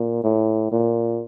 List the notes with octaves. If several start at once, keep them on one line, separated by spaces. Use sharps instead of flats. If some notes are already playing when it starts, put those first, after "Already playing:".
Already playing: A#2
A2
A#2